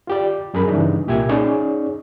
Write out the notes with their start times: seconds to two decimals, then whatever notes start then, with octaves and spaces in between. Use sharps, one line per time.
0.07 F4 G4 D5
0.54 F#2 G#4 A#4 B5
0.68 G2 C#3 E3 D4 D#4
1.07 C2 A#2 G4 E5 G#5 G#6
1.29 C#4 D#4 G#4 C#5 D5